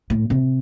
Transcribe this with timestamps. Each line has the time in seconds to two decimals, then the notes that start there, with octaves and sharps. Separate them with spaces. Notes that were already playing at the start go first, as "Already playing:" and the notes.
0.10 A2
0.30 C3